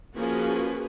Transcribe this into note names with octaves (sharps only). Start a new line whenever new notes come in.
F3 A#3 C#4 F#4 G#4 B4